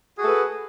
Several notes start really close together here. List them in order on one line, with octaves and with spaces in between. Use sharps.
G#4 F#4 A4 B4